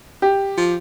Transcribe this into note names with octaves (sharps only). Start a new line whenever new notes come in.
G4
F3